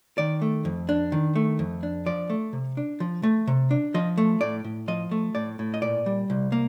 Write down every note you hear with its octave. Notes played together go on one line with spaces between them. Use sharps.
D#3 D5
A3
F2
D4
D#3
A3
F2
D4
F3 D5
A3
C3
D4
F3
A3
C3
D4
F3 D#5
A3
A2 D5
A2
F3 D#5
A3
A2 D5
A2
D#5
A#2 D5
G3
C2
A#3